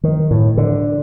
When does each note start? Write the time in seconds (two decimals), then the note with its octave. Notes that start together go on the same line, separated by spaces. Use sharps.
0.04 D#3
0.31 A2
0.57 D3